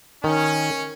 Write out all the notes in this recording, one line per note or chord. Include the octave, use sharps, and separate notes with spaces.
D#3 C#4